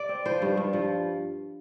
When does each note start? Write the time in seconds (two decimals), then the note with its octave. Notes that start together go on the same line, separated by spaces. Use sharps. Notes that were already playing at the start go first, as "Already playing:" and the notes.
Already playing: D5
0.09 C4
0.25 F3 C5
0.42 G2
0.57 G2
0.73 F3